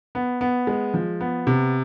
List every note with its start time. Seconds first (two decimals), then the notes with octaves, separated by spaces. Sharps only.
0.15 B3
0.41 B3
0.67 G#3
0.94 F3
1.21 B3
1.47 C3